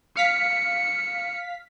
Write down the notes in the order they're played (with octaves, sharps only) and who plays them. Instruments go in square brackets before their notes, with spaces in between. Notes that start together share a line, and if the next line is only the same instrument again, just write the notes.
[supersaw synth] F5 B6 [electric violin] C#7